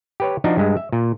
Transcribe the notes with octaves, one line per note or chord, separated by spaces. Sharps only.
G4 B4 C#5
F3 D4 D#4 F#4
G2 G#3
E5
A#2